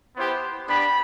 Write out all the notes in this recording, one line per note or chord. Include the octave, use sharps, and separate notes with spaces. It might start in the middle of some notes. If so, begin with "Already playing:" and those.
B3 E4 G4 C5
B3 D4 G4 B5